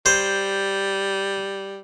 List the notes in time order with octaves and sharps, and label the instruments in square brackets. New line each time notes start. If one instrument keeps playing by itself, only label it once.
[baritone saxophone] G3 [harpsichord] C5